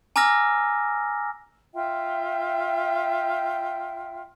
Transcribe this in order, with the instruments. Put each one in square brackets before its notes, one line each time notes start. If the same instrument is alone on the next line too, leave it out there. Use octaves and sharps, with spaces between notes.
[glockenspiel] G#5 A#5 D6 E6 F6 A#6
[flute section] F4 E5 G5